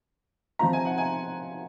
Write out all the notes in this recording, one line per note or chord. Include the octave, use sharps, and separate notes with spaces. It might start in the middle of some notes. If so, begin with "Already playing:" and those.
F3 C4 F4 A#5
G#5
F#5
G#5